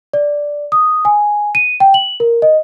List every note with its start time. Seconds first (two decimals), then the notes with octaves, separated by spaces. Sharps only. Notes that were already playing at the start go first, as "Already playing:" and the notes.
0.13 D5
0.72 D#6
1.05 G#5
1.55 D#7
1.80 G5
1.94 F#7
2.20 A#4
2.42 D#5